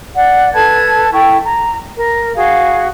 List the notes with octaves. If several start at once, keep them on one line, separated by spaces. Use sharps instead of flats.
D5 F#5
A4 B4 A5 G#6
E4 A4 G5 C#6
A#5
A#4
F#4 G#4 F5